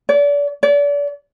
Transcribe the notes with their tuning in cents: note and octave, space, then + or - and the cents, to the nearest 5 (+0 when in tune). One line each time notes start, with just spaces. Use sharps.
D5 -35
D5 -35